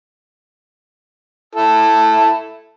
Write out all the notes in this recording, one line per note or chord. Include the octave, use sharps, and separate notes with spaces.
E4 A4